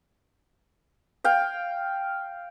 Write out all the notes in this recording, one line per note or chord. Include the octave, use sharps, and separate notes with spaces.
F5 G5